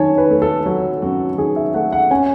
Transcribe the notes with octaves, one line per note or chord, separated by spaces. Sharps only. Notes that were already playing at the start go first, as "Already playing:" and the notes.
Already playing: F#2 D#3 C#5 G#5 A5
B4
A3
A4
F#3
F#2 F#4
D#3 G#4
E5
A3 F#5
F#5
C#4 G#5